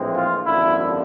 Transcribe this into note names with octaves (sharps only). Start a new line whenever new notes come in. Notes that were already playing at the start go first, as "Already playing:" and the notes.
Already playing: A#1 A2 E3 G#3 C4
F4
G#1 F#2 D3 F3 A#3 E4